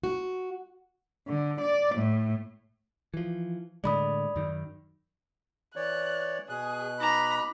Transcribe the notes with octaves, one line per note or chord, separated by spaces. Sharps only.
F#4
D3
D5
A2
E3 F3
A2 D3 G#3 D5 B5 D#6
F#2 D#3
E3 C#5 D5 F#6
B2 G#4 F#6
D#4 A#5 B5 D6